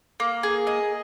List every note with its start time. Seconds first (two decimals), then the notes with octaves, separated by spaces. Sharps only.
0.20 A#3
0.43 G#4
0.67 D#5